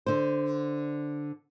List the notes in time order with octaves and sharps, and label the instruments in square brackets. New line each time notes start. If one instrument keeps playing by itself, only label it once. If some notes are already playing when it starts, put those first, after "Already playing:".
[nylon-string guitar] D3 C5